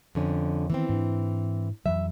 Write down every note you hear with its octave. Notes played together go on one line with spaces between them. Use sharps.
F2 D3 C#4
D#3 E3 B3 C4
G#2 D4
F2 E3 F#3 E5